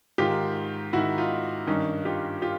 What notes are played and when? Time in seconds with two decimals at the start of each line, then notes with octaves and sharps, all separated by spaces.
0.18 G#2 D#3 F4 G4
0.93 G#2 D#3 E4 F#4
1.18 D#4 F4
1.67 G2 D#3 C#4 D#4
2.05 F4 G4
2.42 F4 G4